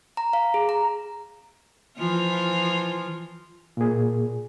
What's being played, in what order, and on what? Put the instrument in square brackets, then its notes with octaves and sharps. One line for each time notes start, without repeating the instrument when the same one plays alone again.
[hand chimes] A#5
F5
G#4
A#5
[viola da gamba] E3 F3 F4
[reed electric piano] A#2 G#4